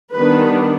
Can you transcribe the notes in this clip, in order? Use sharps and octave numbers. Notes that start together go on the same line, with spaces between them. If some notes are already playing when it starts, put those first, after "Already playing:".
D#3 G3 B3 D4 B4